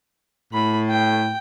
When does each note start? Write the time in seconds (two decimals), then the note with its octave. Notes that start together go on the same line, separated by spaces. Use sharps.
0.53 A2 B5
0.90 G5